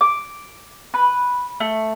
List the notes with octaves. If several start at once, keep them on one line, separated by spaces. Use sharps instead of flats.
D6
B4
A3